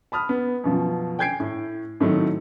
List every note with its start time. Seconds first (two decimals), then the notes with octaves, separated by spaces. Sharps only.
0.12 A5 B5 D#6 F6
0.29 B3
0.64 F#2 B2 F3
1.19 G5 G#5 G6 G#6 C7 D7
1.40 A2
2.00 A2 D#3 F#3 A3 C4 D#4